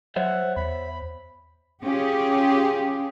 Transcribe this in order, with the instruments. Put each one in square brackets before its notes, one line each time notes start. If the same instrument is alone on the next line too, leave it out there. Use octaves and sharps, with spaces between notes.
[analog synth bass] F#3 [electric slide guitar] C5 C#5 E5 [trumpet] F#5
[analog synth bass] E2 [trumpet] B5
[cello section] C#4 F4 G4 G#4